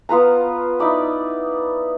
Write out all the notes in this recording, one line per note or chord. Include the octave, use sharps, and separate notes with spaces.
B3 F4 B4 A#5
D#4 E4 D5 B5